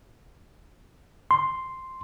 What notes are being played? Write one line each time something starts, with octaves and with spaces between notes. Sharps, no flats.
C6